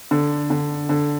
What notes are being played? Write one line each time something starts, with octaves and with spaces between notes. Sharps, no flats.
D3
D3
D3